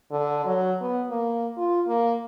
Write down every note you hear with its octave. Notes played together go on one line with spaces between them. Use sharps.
D3
F#3
B3
A#3
F4
A#3